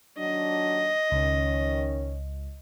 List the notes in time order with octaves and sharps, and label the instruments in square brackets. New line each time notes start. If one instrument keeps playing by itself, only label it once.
[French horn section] D#2 F#3 D4 [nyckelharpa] D#5
[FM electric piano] C#2 [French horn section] D#3 C#4